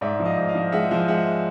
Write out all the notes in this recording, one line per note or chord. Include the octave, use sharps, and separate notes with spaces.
G#2 D5 E5
F3
D#5 F5
G#2
D#5 F5
F3
G#3 E5 F#5
F3
G#3 E5 F#5